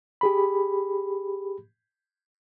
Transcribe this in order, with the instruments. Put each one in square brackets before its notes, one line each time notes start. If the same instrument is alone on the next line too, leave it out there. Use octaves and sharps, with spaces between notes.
[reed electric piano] G4 G#4 B5